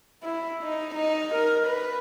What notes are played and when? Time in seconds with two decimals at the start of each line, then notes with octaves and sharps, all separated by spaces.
0.23 E4
0.63 D#4
0.95 D#4
1.34 A#4
1.67 B4